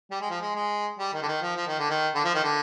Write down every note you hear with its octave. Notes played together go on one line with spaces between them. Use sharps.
G3
G#3
F3
G#3
G#3
G3
D#3
D3
D#3
F3
F3
D#3
D3
D#3
D3
F3
D#3
D3